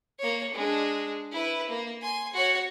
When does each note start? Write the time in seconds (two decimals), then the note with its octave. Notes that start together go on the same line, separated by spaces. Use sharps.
0.19 A#3 C#5
0.53 G#3 D4
1.31 E4 B4
1.69 A#3
2.01 G#5 C6
2.34 F#4 C#5